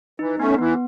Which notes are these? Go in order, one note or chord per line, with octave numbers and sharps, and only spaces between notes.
E3 D#4
A3 B3 C#4
E3 B3